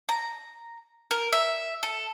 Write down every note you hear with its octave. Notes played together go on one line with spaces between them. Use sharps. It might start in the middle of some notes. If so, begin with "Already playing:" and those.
A#5
A#4
E5
A4